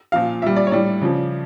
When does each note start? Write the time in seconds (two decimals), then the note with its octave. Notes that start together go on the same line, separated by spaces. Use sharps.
0.12 A#2 F3 F5
0.42 A#2 G3 E5
0.56 D5
0.67 C#5
0.72 A2 G3 D5
1.01 C#3 F3